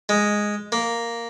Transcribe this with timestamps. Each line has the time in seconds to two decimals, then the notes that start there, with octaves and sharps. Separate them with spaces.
0.09 G#3
0.72 A#3